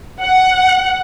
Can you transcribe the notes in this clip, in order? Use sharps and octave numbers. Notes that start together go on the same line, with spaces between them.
F#5